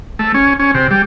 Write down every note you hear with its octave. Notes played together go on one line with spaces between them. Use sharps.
A3
C#4
C#4
C3
G3